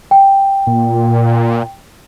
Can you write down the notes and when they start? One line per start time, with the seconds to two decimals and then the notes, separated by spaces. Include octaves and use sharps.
0.11 G5
0.67 A#2